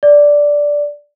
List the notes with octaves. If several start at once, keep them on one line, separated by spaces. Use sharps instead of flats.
D5